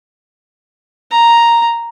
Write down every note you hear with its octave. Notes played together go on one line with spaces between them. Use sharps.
A#5